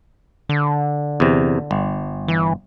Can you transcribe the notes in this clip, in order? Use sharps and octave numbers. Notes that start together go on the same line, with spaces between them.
D3
E2 C3
G1
E3